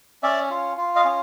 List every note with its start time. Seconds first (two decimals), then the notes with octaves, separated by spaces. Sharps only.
0.23 C#4 D5 E5
0.51 F4
0.78 F4
0.96 D#5 F5
1.05 C#4